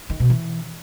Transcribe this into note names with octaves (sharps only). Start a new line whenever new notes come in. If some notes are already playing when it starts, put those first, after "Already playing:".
D#3
B2
E3